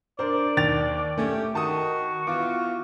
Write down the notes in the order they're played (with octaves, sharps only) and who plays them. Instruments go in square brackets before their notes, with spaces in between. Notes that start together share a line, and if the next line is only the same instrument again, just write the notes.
[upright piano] D4 A#4 C5 [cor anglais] D5
[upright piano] D#2 A6 F7
[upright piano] A3 [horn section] C#4 G4
[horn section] D#3 [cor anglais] F#4 [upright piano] A5 D#6
[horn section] E3 B3 F4 [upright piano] D6